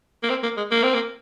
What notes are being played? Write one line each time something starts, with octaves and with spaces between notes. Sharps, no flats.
A#3
C4
A#3
G#3
A#3
C4
A#3